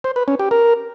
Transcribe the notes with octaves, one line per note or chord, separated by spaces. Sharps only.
C5
B4
C#4
G4
A#4